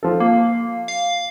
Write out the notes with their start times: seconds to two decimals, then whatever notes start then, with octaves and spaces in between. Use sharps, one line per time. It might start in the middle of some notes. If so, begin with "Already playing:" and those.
0.03 F3 A4
0.20 A#3
0.88 F5